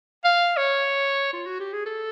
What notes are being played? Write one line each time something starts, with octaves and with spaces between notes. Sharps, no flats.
F5
C#5
F4
F#4
G4
G#4
A4